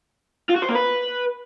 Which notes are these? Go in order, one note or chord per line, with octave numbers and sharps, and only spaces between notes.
F4
F#4
C5
A#3
B4